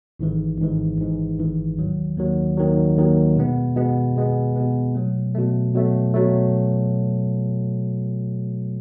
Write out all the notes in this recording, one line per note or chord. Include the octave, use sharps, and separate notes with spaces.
G#1 G#2 E3
G#1 G#2 E3
G#1 G#2 E3
G#1 G#2 E3
D#2 D#3 F#3
D#2 D#3 F#3
D#2 D#3 F#3
D#2 D#3 F#3
B2 G#3 B3
B2 G#3 B3
B2 G#3 B3
B2 G#3 B3
B2 F#3 A3
B2 F#3 A3
B2 F#3 A3
B2 F#3 A3